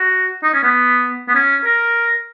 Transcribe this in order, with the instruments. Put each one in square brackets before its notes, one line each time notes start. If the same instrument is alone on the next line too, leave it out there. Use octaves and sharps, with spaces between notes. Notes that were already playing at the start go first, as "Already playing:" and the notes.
Already playing: [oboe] F#4
D#4
C#4
B3
B3
C#4
A#4